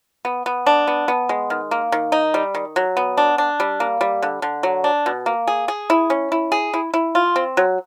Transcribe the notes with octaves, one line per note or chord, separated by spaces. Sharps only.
B3
B3
D4
B3
B3
G#3
D#3
A#3
D#3
D#4
G3
D#3
F#3
B3
D4
D4
G3
A#3
G3
D3
D3
F#3
D4
B2
A#3
G#4
G#4
E4
C#4
E4
G#4
E4
E4
F4
C4
F#3